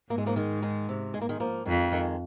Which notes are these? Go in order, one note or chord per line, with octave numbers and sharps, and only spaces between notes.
G#2 A#3
G#3
F3 A#3
D#3 G#3
D#3 G#3
C3
G#3
A#3
D#3 G#3
F3 A#3
F2 D#3 G#3
D#3 G#3